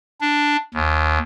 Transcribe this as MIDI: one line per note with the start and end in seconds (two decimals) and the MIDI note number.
0.21 0.56 62
0.74 1.19 39